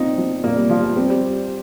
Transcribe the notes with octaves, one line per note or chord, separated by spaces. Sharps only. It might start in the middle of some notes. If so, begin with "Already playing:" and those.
Already playing: A#2 C4 D#4 F4
F3
A#2 A#3
G3
F3 F4
G3
G3 C4
G3